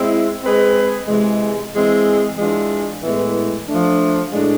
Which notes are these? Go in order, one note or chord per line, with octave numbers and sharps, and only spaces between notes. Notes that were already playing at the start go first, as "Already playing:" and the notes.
Already playing: G#3 C4 E4
G#3 C4 G#4 B4
C3 E3 G#3
E3 G#3 C4 G#4
E3 G#3 D4 F4
A2 E3 G#3 B3
F3 A3 D4
A2 G#3 D4